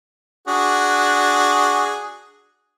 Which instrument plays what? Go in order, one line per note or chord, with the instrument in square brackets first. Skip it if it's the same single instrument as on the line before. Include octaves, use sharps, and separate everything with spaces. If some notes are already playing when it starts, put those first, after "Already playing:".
[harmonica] D4 F#4 G#4